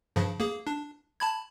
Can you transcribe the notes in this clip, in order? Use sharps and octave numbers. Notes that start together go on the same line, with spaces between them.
G2 C#3 F3
A#3 G#4
D4
A5 B5 G#6